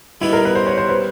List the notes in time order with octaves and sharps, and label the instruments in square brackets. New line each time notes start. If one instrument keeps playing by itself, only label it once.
[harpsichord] G3 B3 D#4 [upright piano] E4
[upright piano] A#4
B4
C5
C#5
C5
B4